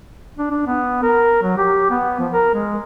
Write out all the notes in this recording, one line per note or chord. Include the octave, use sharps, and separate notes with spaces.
D4
D4
B3
A#4
F#3
G4
B3
F3
A#4
G#3